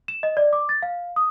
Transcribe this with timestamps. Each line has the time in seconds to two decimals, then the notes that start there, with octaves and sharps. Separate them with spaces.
0.08 E7
0.23 D#5
0.37 D5
0.53 D6
0.69 A6
0.82 F5
1.16 D#6